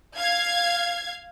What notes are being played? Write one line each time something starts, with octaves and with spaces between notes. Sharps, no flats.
F5 G#6